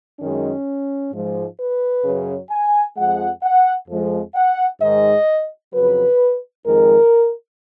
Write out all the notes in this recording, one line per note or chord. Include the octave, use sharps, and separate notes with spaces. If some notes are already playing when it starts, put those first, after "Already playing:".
F#2 D#3 G#3 C#4
G#2 F3 G#3
B4
F#2 C#3 F#3
G#5
F2 F3 G#3 F#5
F#5
F2 F3 G#3
F#5
G#2 D#3 G#3 D#5
F2 C#3 F#3 B4
F2 D#3 G#3 A#4